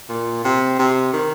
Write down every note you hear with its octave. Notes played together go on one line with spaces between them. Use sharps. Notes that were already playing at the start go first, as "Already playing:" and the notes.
A#2
C3
C3
D#3